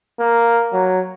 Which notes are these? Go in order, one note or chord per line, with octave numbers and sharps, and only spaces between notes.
A#3
F#3